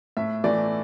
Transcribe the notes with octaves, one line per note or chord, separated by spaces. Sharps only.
A2 E5
E3 A3 D5